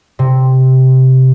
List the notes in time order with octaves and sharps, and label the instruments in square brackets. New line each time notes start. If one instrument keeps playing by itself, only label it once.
[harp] C3